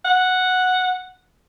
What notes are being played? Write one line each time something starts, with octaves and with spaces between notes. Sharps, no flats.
F#5